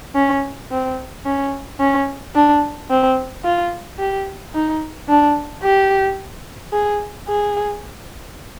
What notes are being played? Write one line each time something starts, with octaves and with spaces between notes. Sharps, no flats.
C#4
C4
C#4
C#4
D4
C4
F4
G4
D#4
D4
G4
G#4
G#4